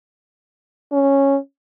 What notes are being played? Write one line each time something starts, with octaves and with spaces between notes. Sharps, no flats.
C#4